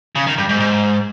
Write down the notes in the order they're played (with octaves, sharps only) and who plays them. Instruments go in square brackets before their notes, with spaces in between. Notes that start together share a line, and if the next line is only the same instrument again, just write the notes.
[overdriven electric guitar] C#3
D#3
G2
G#2
G#2